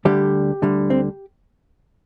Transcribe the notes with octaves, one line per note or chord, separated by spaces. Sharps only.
D2 D3 G3 G4
D2 D3 G3
C4